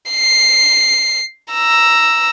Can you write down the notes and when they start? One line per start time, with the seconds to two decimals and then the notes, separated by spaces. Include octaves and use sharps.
0.10 C7
1.53 A#5 E6